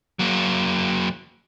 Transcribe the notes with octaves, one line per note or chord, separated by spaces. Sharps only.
F#3 A#3